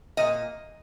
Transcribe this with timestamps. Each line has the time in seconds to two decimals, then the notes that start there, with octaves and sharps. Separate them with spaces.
0.17 A#2 D#5